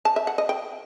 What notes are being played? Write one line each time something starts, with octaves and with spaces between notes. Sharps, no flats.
A5
E5
F#5
D#5
G5